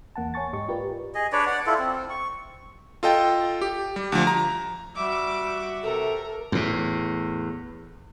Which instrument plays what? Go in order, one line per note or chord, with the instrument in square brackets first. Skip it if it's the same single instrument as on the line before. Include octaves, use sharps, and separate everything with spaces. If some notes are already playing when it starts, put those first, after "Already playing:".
[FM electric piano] E2 A#3 F#5 A5
C#5 G#5 C#6 A6
G#2 G4 D#5 C#6
F4 G4 A#4 B4 D5
[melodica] G#4 D#5
D4 B4 C#5 D5
D5 F#5
E4 F4 A4
C4
C#6
[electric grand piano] F4 A4 D#5 G5
G4
G3
D2 F3
A#5
[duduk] G3 [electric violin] F#4 E5 [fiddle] D6
[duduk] C3 [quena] A4 [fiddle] A#4
[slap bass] E2 A2